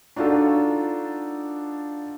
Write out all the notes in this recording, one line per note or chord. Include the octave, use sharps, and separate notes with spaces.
D4 D#4 F4 F#4 A4